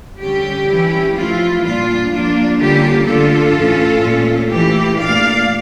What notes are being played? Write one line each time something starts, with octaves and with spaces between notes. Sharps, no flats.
D3 G3 C#4 G4
E3 G3 C#4 E4
F3 A3 E4 F4
A#2 G3 D4 F4
F3 A#3 D4 F4
D3 G3 A#3 C#4 F4 G4
D3 A3 D4 F4 A4
A2 E3 A3 C#4
A#2 A3 C#4
E3 A3 E4 G4
A#2 A3 D4 D5 F5